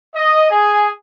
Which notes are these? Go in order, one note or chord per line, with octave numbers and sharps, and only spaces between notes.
D#5
G#4 G#5